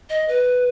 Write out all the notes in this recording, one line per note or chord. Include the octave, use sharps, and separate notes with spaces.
D#5
B4